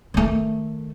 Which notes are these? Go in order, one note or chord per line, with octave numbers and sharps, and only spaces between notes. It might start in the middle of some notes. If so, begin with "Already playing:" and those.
D#3 A3